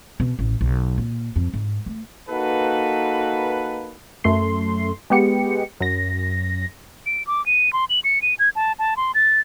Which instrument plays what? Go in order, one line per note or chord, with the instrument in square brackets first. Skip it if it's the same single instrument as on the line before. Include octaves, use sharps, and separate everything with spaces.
[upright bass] B2
A1
B1
A#2
F2
G#2
A3
[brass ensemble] A#3 D#4 F#4 A4 B4
[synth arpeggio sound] F#2 A3 C6
G#3 B3 G4 C#7
F#2 A#6
[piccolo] D7
D6
D#7
C6
F#7
C#7
D#7
G#6
A5
A5
C6
A6